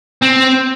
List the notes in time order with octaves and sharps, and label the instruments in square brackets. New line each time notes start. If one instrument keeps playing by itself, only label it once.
[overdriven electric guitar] C4